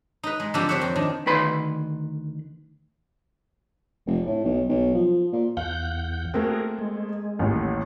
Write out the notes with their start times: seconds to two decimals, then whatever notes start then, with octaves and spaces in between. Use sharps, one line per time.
0.23 D#4 B4
0.40 G#3
0.54 D3 F3 A#3 C4 D4 G4
0.69 C4 C5 C#5 E5 F#5
0.81 F2
0.96 D#3 D4
1.26 D2 D#3 B4 B5 C6
4.07 F1
4.26 A2
4.44 B1
4.69 B1
4.95 F3
5.33 A#2
5.57 E2 F5 F#5 G6
6.34 A3 A#3 C4 F#4 G#4 A#4
6.79 G#3
7.39 A1 D#2 A2